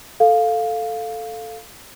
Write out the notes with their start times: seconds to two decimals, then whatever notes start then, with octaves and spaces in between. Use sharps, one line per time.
0.20 A4 F5